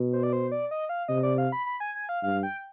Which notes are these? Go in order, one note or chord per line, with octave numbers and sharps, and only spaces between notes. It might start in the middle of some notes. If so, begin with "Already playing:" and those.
Already playing: B2
C5
D5
C5
D5
D#5
F5
C3 D#5
D5
F5
B5
B5
G#5
G#5
F5
G2 F5
G5